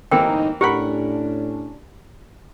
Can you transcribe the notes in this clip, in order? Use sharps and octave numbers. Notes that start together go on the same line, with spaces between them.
G1 A2 E3 A#3 C4 D#4 G5
A2 C#4 D4 G4 A#4 F#5 B5